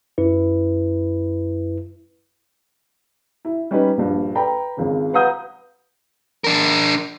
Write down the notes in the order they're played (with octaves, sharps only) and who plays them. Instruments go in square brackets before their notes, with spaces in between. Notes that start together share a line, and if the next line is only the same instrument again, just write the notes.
[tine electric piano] F#2 E4 B4
[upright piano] E4
G3 C#4 D#4 B4
A#1 G2
A4 B4 D5 G5 A#5 B5
G#1 C#2 C#3
B4 F5 F#5 A#5 D#6 G6
[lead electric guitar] D4 A#4